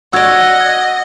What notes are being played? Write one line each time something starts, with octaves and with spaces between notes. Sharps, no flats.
F#4 D5 D#5 F#5 E6 G#6
G#6